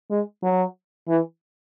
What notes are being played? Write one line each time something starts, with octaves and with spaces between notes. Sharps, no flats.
G#3
F#3
E3